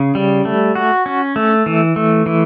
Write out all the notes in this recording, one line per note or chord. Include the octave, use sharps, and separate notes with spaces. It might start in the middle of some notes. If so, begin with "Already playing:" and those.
Already playing: C#3
G3
A3
F#4
C#4
A3
E3
A3
E3